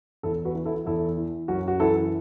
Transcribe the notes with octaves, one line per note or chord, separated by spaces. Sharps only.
E2 E4 A4
F#4 B4
E3
E4 A4
E2 E4 A4
E3
F#2 C#4 F#4
F#4
E3 E4 A4